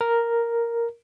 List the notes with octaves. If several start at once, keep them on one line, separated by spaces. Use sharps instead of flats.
A#4